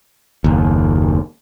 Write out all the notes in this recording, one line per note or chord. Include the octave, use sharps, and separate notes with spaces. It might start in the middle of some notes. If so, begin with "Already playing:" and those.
F#1 D#2